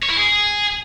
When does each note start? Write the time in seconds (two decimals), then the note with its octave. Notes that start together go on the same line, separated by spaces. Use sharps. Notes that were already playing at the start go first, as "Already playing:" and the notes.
0.03 C#5
0.10 E4
0.17 G#4